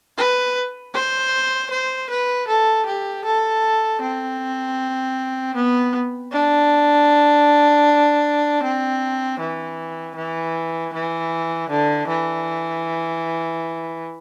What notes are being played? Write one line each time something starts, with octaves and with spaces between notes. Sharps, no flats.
B4
C5
C5
B4
A4
G4
A4
C4
B3
D4
C4
E3
E3
E3
D3
E3